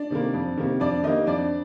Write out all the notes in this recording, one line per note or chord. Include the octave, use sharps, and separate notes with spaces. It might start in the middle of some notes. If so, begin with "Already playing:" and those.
Already playing: D4 D5
C3 D#3 G3 A#3
F2
C3 D#3 G3 A#3
F2 D4 D5
D#3 G3 A#3 D#4 D#5
F2 D4 D5